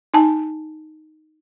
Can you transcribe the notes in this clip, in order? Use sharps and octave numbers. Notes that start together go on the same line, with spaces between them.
D#4 G#5 A5